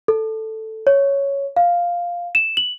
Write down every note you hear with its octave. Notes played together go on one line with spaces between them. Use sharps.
A4
C#5
F5
E7
F#7